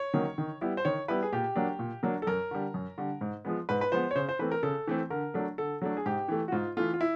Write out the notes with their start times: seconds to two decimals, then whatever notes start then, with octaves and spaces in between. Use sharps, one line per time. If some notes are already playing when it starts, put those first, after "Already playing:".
Already playing: C#5
0.14 D#3 F#3 A#3 C#4
0.38 D#3
0.61 G3 B3 E4
0.77 C5
0.85 D#3 C#5
1.08 G3 B3 E4 B4
1.23 G#4
1.33 A#2 G4
1.56 F#3 A#3 D4
1.79 A#2
2.03 F#3 A#3 D4
2.22 A4
2.27 F#2 A#4
2.51 D3 G3
2.74 F#2
2.98 D3 G3
3.21 G#2
3.45 F3 G#3 B3
3.69 G#2 B4
3.81 B4
3.92 F3 G#3 B3 C5
4.11 C#5
4.16 C#3 C5
4.29 C5
4.39 E3 A3 C4 B4
4.52 A#4
4.63 C#3 A4
4.88 E3 A3 C4
5.10 D3 A#4
5.34 F#3 A3 D4
5.58 D3 A4
5.82 F#3 A3 D4
5.97 G#4
6.06 G#2 G4
6.28 E3 A3
6.48 F#4
6.52 G#2 F4
6.77 E3 A3 F4
6.94 F4
7.01 E4